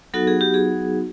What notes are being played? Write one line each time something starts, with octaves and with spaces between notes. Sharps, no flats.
F#3 B3 D#4 F#4 A4
G#4
G4
G#4